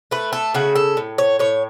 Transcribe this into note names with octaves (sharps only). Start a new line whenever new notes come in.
A3 B4
A4
C#3 F#4
A4
A2
C#5
A2 C#5